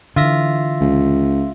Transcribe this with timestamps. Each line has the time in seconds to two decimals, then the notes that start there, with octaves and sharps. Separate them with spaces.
0.16 D3 E3 F4 E5 A#6
0.81 C#2